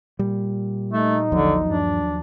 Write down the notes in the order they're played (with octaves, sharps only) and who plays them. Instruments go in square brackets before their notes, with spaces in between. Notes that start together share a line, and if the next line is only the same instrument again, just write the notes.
[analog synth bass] A#2 [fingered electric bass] G3
[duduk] A3 [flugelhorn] D#4
[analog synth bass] A1 [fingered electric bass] D#2 F3 F#3 [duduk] D3
[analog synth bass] G2 [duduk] D4